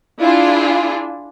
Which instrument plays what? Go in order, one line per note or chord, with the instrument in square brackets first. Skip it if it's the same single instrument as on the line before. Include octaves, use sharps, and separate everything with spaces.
[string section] D4 E4 F4 G#4